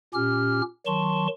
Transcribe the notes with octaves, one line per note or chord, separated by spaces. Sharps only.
A#2 C#4 G4 F6
D#3 F#3 A5 C6 C#6